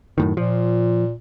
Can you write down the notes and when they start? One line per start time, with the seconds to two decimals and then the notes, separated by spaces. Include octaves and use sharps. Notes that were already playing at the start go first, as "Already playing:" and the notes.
0.18 F#2 A2 D#3
0.37 A#2 F3